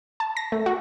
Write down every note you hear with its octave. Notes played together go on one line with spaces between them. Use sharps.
A5
A#6
A3
F#4